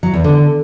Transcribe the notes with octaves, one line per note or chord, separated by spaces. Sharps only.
F#3
E2
D3